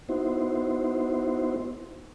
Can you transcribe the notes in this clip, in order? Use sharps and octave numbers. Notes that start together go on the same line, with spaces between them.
B3 D#4 E4 F#4 C5